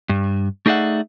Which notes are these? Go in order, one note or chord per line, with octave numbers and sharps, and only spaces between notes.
G2
A3 D#4 G#4 D5 E5 F#5